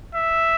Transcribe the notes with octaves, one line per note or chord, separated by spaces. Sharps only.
E5